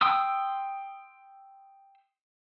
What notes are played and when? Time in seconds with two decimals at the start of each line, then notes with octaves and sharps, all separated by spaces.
0.01 G5 C6 D#6 E6